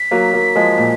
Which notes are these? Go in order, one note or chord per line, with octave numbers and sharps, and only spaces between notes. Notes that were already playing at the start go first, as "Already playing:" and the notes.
Already playing: B6
F#3 A#3
F#3 A#3
F3 G#3
A#2